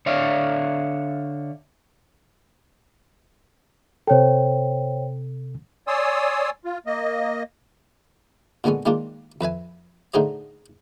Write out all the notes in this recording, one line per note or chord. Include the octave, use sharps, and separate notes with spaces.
D3 C#5 D5 E5 F5
C3 A4 C5 C#5 G5
C#5 D5 G#5 C6 D#6 E6
F4
A#3 D#5
A#2 D3 G#3 B3 C#4
D#3 G#3 A#3 D4 F4
F2 B4 E5 G#5
A2 D3 D#4 G#4 C5 D#5